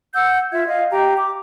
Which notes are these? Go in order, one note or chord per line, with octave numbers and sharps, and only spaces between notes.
F#5 E6 G6
F4 E5 G#6
D#5 F5
G4 G5 A#5
D6